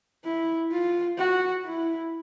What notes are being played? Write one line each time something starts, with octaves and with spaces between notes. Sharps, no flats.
E4
F4
F#4
E4